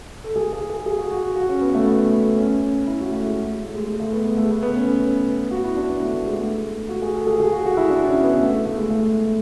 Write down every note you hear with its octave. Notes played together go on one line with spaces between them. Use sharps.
A4
G#4
G#4
G#4
G#4
F#4
F#4
F#4
C#4
B3
A3
B3
C#4
E4
F#4
A3
G#3
G#3
A3
G#3
G#3
A3
B3
B3
A3
B3
B3
C#4
F#4
E4
D4
B3
A3
A3
G#3
A3
F#4
G#4
A4
G#4
G#4
F#4
F#4
E4
D4
C#4
B3
A3
A3
G#3
A3